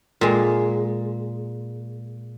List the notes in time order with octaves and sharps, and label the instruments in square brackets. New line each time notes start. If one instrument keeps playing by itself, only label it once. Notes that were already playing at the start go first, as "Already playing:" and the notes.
[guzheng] A#2 G#3